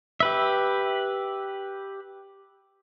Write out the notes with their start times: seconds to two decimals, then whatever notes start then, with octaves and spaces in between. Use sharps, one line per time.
0.20 G4 B4 E5